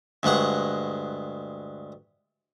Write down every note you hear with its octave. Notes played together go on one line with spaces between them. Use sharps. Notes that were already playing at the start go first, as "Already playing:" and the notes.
D2 G2 G#3 F#5 C#6